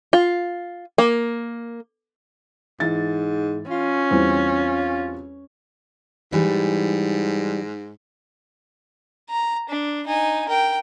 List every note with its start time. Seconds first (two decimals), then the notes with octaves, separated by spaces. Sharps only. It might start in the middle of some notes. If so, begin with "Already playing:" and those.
0.13 F4
0.98 A#3
2.80 G#2 E3 A6
3.70 C#4 F4
4.11 E2 G3 C4
6.32 G#2 E3 G3
9.30 A#5
9.69 D4
10.07 D#4 G#5
10.49 A#4 G5